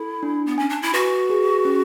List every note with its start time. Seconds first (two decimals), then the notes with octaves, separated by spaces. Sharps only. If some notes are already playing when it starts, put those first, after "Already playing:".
Already playing: E4 A4
0.23 D4
0.46 B3
0.58 C#4 G#5
0.69 D4
0.82 E4
0.93 F#4 B4
1.30 G#4
1.65 C#4